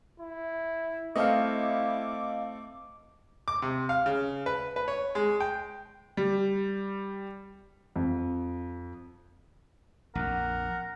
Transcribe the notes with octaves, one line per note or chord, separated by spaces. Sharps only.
E4
A3 C4 E4 A4 D#5 F5 D6
D6
C3
F5
C#3
B4
B4
C#5
G#3
G5
G3
F2
A#1 F2 A#4 F#5